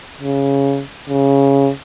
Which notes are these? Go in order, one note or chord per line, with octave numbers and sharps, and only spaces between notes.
C#3
C#3